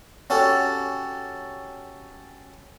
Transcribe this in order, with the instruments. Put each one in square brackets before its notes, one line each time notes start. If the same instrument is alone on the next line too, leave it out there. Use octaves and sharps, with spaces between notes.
[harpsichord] C#4 F#4 G4 A4